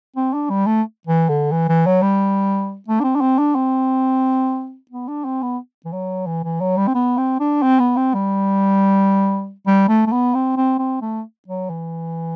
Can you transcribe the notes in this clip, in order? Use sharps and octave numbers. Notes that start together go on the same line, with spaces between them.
C4
D4
G3
A3
E3
D3
E3
E3
F#3
G3
A3
D4
C4
D4
C4
D4
C4
B3
D4
C4
B3
E3
F#3
E3
E3
F#3
G3
C4
B3
C4
D4
C4
B3
C4
G3
G3
A3
A3
B3
C4
C4
C4
A3
F#3
E3